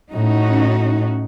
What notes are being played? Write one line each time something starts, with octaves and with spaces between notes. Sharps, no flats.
A2 C#4 D#4 F#4